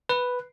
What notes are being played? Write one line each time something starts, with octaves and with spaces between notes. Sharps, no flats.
B4